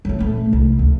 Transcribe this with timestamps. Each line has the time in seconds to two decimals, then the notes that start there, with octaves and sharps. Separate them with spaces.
0.05 F#3 A3
0.19 D#1 A3
0.53 C2
0.79 D2